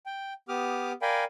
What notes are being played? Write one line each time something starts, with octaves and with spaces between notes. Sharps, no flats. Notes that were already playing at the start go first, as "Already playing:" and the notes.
G5
B3 G4 D6 D#6 F6
A#4 D5 F5 G5 G#5 B5